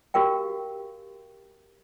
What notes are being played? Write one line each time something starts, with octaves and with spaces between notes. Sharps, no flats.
F#4 G4 A#4 F5 G5